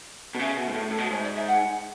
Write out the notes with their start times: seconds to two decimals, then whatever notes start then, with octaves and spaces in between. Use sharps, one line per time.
0.35 B2
0.39 C#3 E5
0.57 B2
0.67 G#2
0.74 A2
0.90 A2
0.98 B2
1.10 G#2 C#5
1.18 E5
1.23 D5
1.34 E5
1.47 F#5